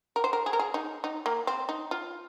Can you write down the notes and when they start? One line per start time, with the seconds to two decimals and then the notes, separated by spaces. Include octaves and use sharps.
0.16 A#4
0.24 C5
0.33 A#4
0.46 G#4
0.53 A#4
0.59 G#4
0.74 D#4
1.04 D#4
1.26 A#3
1.47 C4
1.69 D#4
1.91 F4